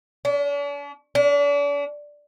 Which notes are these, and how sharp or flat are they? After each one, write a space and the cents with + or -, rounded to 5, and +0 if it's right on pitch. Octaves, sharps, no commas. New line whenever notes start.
D4 -45
D4 -40